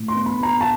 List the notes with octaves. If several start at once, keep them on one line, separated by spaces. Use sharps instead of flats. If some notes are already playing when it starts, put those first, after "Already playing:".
Already playing: A2
C6
B3
B5
B3 A#5
A5